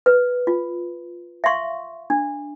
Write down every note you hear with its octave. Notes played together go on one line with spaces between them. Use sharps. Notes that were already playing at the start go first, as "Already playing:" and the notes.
B4
F4
E5 F5 C6 C#6
D4